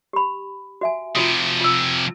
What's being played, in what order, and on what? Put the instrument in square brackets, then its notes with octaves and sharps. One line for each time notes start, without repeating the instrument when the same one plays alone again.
[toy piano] G4 B5
F#4 E5 G#5
[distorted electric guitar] C3 F3 [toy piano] F4 F#4 D#6
[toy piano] F4 E6